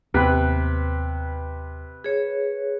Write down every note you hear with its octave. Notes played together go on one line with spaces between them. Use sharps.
D#2 C3 B3 B4 B5 F#6
G#4 C#5